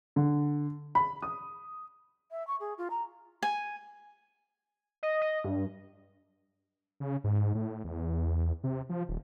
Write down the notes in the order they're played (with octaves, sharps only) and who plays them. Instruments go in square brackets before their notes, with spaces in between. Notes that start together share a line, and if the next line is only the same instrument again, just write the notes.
[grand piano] D3
B5
D#6
[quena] E5
C#6
G#4
F4
A#5
[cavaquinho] G#5
[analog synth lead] D#5
D#5
G2
[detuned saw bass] C#3
G#2
A2
E2
C3
F3
D#1